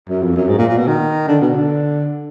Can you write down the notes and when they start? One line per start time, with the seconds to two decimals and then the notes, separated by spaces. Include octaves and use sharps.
0.09 F#2
0.22 F2
0.36 F#2
0.49 G#2
0.58 A#2
0.69 A#2
0.78 B2
0.88 D#3
1.28 D3
1.41 B2
1.54 D3